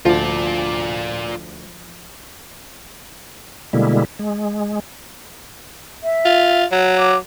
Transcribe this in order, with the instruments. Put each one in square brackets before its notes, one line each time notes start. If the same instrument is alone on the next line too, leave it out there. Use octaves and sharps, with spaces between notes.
[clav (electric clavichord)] D2 [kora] F3 [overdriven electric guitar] F4 D5
[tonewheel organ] B2 D3 G3 G#3 A#3 E4
G#3
[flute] E5
[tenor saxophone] F4
F#3
[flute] D6